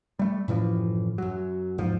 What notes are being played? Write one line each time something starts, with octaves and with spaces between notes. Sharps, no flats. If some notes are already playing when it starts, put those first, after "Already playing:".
G3 A3
F#2 A2 E3 F3
F#2 F#3
E2 G#2 F3